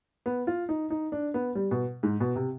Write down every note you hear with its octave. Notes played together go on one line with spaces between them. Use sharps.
B3
F4
D#4
D#4
D4
B3
G3
B2
G#2
B2
C3